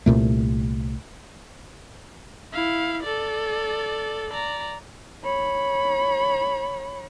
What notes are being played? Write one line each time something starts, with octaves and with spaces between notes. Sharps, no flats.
C2 A#2 A3
E4 F5
A4 D5
D5 A#5
C#5 B5